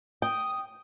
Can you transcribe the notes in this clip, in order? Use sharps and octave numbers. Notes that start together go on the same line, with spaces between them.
G5 D#6